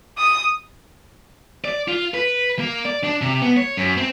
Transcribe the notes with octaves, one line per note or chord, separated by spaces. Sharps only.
D#6
D5
F4
B4
A#3
D5
D4
C3
B3
C#5
F#2
C4